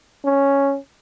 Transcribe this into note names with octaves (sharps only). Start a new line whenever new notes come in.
C#4